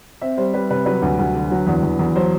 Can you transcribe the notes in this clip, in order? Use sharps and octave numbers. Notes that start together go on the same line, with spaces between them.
C4 E5
G3 C5
G3 B4
C3 B4
F#3 B4
D2
D2
D3
F#3
E2
E2
E2
F#3 C5